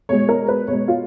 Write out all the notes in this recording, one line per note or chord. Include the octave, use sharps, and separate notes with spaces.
B2 G#3 C#5
A#4
B4
B2 G#3 C#5
F4